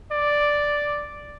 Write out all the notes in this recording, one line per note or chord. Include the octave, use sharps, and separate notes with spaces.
D5